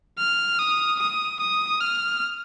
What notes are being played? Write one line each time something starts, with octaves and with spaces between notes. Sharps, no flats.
F6
D#6
D#6
D#6
F6